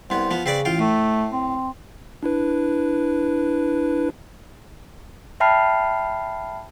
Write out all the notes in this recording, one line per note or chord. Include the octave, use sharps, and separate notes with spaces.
C2 B3 C5
F3 B3
C#3 C4 B4 D5
A1 F4 G5
A2 A3
C4
D4 E4 B4
E5 G5 A5 B5 F6 C7